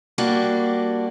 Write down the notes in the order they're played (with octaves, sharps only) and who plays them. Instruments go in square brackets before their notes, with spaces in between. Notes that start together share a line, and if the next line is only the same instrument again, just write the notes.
[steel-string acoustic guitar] G3 A#3 D4 F#4 G4